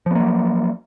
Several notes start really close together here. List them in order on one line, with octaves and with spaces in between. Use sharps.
F3 B3 A#3 F#3